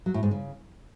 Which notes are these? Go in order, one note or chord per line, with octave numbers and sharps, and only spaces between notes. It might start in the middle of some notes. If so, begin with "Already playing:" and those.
F#3
A2
G#2
C#3